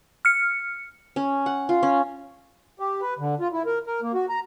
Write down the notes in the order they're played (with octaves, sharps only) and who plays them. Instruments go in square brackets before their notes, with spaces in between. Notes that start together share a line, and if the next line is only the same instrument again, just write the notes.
[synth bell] F6 C#7
[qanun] C#4
F#5
F4
C#4
[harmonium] G4
B4
D3
F4
E4
A#4
A#4
A#3
F#4
A#5